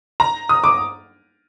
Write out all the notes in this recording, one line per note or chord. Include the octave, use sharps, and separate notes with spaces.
A#5
D#6
D6